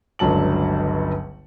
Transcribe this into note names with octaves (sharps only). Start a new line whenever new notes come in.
G1 C#2 D3 F#3 A5 F#7